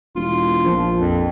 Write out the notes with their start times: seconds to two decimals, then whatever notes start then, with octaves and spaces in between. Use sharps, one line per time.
0.16 E1 F4
0.64 A#1 F3
0.98 F2